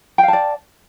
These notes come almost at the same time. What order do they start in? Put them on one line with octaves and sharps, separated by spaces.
G5 F5 A5 D5